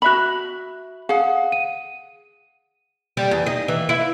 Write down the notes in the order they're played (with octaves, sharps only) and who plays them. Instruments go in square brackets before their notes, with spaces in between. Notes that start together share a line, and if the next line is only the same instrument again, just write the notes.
[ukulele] F#4 E5 B5 [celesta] F#6 F#7
[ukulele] G#4 F#5 [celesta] F5
[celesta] D#7
[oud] G3
E2
D#4
E3
E4